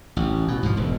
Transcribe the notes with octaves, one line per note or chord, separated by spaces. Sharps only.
A1
B2
G#2 B2 F3
E1